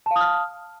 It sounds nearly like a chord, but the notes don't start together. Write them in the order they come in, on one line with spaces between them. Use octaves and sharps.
A5 F5 D#6 F6